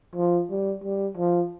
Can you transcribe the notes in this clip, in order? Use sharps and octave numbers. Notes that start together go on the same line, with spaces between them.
F3
G3
G3
F3